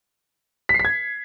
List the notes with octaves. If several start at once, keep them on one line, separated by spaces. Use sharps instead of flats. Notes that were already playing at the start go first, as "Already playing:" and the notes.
B6
C7
B6
G#6